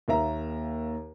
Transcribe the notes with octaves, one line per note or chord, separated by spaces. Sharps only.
D#2 A#3 E5 A#5